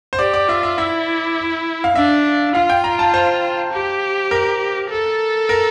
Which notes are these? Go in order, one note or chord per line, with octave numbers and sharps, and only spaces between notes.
C5
G4 D5
D5
F4 E5
E5
E4 E5
F5
D4 E5
F4 F5
G5
A#5
A5
C5
G4
A#4
A4
A#4